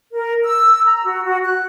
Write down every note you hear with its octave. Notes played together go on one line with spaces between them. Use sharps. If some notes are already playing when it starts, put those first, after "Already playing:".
A#4
E6
A#5
F#4
F#4
F#6